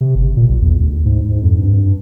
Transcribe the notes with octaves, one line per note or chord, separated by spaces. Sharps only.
C3
G1
A#2
B1
E2
D2
G#2
G#2
F2
G2
G2